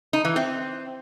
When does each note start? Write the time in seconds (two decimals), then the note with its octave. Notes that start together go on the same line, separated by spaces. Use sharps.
0.13 D#4
0.25 E3
0.36 C4